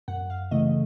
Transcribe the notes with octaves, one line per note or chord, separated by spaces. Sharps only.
F#2 F#5
F5
C#3 E3 A3 D#5